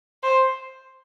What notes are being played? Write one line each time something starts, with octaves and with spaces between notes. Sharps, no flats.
C5